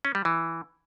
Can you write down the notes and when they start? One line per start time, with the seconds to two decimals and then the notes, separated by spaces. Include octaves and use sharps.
0.05 C#4
0.15 G3
0.25 E3